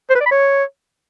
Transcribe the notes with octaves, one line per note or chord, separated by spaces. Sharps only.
C5
B4
D5
B5
C#5